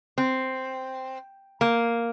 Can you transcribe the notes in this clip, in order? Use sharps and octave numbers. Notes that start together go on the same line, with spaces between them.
C4
A#3